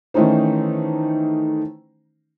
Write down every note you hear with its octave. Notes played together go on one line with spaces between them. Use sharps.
D#3 E3 A3 C#4 D#4 C5